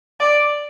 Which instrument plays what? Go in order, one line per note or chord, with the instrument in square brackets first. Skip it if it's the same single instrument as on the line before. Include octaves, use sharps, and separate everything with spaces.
[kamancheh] D5